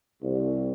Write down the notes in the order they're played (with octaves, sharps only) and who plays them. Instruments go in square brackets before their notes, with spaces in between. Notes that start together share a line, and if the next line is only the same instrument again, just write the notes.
[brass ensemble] C2